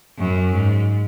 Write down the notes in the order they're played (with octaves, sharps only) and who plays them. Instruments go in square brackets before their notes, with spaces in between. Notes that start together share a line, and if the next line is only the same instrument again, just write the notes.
[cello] F#2
G#2